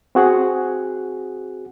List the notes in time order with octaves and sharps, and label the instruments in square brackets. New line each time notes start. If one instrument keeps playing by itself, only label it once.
[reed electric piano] C4 F#4 G#4 F#5